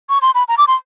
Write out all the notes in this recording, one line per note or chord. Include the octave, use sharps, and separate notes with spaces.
C#6
C6
B5
A#5
D6
C6